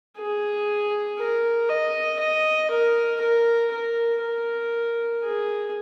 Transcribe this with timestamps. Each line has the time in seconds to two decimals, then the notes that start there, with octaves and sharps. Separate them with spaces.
0.18 G#4
1.19 A#4
1.70 D#5
2.20 D#5
2.71 A#4
3.21 A#4
3.72 A#4
4.23 A#4
5.24 G#4